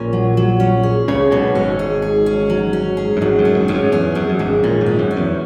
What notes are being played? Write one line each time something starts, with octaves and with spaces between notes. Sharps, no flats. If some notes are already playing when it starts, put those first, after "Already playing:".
Already playing: A#1 A#2 C#4
F#3
F#3
C#4
G#4
C#2 C#3 C#5
B1 B2 C#5
G#1 G#2 C#4
G#4
G#4
C#4
F#3
C#4
G#4
F#2
G#1 G#2 F#3
F#2
G#4
G#1 G#2
G#2 C#4
F#2
E2 G#4
F#2 G#4
F#2
G#1 G#2 G#4
A#1 A#2 C#4
G#1 G#2
C#4
F#2
C#4
E2